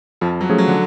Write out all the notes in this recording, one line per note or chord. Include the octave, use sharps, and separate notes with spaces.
F2 F3
F#3
F3 A3 C#4 G#4
F#3
D3